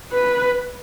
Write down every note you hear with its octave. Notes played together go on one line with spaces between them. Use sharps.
B4